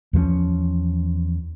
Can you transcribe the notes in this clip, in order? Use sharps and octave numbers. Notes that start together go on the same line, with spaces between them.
E2 F3 G#3 C#4